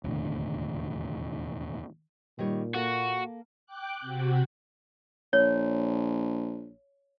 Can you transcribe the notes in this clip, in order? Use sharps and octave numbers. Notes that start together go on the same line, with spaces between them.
E1 D#2 A2 D3
A#2 D#3 G3 C#5
A#3 F#4 A4
G5 D6 F#6
C3 F#4
A#1 C#5